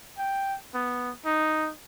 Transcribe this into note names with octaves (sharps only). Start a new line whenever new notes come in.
G5
B3
D#4